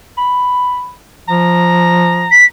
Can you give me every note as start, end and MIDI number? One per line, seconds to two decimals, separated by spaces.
0.18 0.91 83
1.28 2.32 53
1.28 2.45 82
2.31 2.45 95